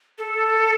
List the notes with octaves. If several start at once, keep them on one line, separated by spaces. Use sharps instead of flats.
A4